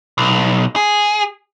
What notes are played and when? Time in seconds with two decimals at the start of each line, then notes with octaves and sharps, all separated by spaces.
0.18 B1
0.76 G#4